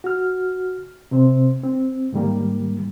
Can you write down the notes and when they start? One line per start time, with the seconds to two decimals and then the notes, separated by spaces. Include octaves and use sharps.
0.04 F#4 F6
1.11 C3 C4 C5
1.64 C4
2.12 G#2 D#3 G3 A#3